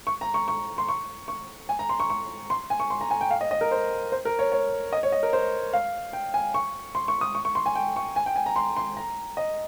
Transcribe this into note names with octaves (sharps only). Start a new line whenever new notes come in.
C#6
A#5
C#6
C#6
C6
C#6
C#6
G#5
A#5
C6
C#6
C#6
C6
G#5
C#6
C6
A#5
G#5
G5
F5
D#5
D#5
A#4
C5
C5
A#4
C#5
C#5
D#5
C#5
D#5
A#4
C5
F5
G5
G#5
C#6
C6
C#6
D#6
C#6
C#6
C6
G#5
G5
C#6
G#5
G5
G#5
A#5
C6
C6
A#5
D#5